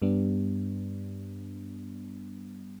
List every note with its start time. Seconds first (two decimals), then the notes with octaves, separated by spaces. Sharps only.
0.02 G2 G3 B3 D4